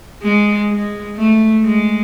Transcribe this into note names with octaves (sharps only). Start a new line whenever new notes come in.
G#3
G#3
A3
G#3